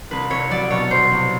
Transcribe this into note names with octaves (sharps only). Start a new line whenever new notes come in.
C2 B4
C2 C#5
F#3 D5
B2 C#5
C2 C5
C2